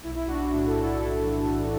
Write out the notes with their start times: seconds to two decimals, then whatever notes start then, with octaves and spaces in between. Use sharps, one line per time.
0.03 B1 E4
0.15 E4
0.27 B1 D4 F#4
0.51 A2 D4 F#4
0.67 E4 A4
0.75 A2
0.82 E4 A4
0.98 A2 E4 A4
1.23 E3
1.46 B1